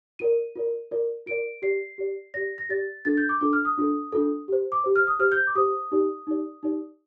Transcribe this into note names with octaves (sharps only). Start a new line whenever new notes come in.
F4 A#4 D5 D#7
F4 A#4 D5
F4 A#4 D5
F4 A#4 D5 D7
G4 D5 C7
G4 D5
G4 D5 A#6
A#6
G4 D5 A6
D4 F4 A4 A6
G6
D6
D4 F4 A4 D6
F6
D#6
D4 F4 A4
D4 F4 A4
G4 C5
D6
G4 C5
F6
D#6
G4 C5 F6
G6
D6
G4 C5 D#6
D#4 G4 D5
D#4 G4 D5
D#4 G4 D5